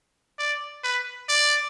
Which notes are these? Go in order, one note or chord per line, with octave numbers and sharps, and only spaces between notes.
D5
B4
D5